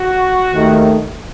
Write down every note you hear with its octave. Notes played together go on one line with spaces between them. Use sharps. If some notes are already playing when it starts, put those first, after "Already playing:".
Already playing: F#4
D#2 D#3 A3